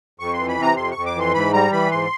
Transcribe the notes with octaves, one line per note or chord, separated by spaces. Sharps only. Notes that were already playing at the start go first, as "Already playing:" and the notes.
F2 C#6
E3 C6
B5
C3 A#5
F2 C6
F2 C#6
D6
E3 C6
G#2 B5
G3 A#5
E3 B5
G#2 C6